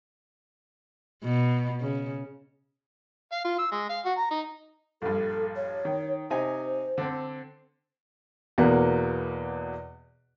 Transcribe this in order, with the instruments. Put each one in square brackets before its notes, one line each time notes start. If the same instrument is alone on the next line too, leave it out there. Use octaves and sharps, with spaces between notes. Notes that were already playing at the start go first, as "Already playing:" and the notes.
[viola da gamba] B2
C#3
[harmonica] F5
F4
E6
G#3
F5
F#4
A#5
D#4
[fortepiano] A#1 G2 [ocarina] A4
[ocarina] C#5
[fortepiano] D#3
[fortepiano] C3 D#4 G#5 [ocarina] C5
[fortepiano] D3 C4
[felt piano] E2 B2 A#3 B3